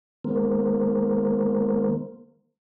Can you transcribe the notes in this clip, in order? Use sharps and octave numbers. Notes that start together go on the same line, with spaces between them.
D#3 G#3 A#3 B3 A#4 C5